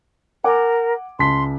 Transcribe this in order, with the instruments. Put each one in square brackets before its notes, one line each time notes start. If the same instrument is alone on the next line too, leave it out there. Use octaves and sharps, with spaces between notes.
[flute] A#4 [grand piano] F#5 G#5 D6
[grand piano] C#2 A5 B6 [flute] C6